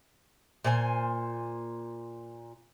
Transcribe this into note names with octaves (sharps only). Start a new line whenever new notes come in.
A#2 C5 G#5